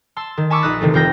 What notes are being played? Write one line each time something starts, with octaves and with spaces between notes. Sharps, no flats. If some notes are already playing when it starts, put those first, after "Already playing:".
A5 C6 E6
D#3
G#5 A5 B5 C#6 D6 E6
A#1 D#4 E5 D#6 F#6 A6
C3 D#3 E3 A3
F1 C4 F4 G5 G6 A#6